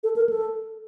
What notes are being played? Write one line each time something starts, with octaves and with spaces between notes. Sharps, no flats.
A4
A#4
A4